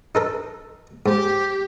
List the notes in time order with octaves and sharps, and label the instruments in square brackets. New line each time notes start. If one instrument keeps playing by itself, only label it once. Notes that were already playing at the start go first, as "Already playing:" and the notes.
[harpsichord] D#4 A4 A#4
[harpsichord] G#2 [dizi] G4